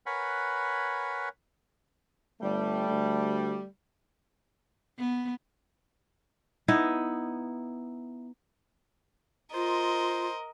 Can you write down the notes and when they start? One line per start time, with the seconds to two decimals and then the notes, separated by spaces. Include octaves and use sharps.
0.06 A#4 B4 C#5 F#5 G#5 B5
2.42 G1 G3 A3
2.89 D2
4.99 B3
6.68 B3 D#4 E4 D#5
9.54 F4 A#4 C5 D#5